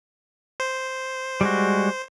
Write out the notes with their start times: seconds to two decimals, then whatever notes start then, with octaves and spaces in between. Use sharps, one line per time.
0.60 C5
1.41 G3 G#3 F#4